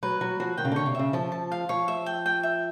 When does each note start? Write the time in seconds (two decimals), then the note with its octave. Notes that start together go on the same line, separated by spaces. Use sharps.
0.03 F#3 B4
0.21 F#3 F#4
0.40 F3 F#4
0.58 D#3 G5
0.65 C#3
0.72 D3 C#5
0.86 C3
0.95 C#3 E5
1.13 F3 A5
1.32 A5
1.52 F5
1.69 F3 C#5
1.88 E5
2.06 G5
2.26 G5
2.43 E5